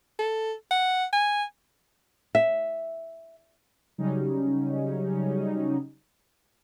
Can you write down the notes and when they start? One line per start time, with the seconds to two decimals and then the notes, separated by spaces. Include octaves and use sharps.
0.19 A4
0.71 F#5
1.13 G#5
2.35 E5
3.98 C#3 F#3 G3 C#4 D#4